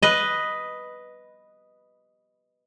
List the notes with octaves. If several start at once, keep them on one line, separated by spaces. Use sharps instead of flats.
B4 D#5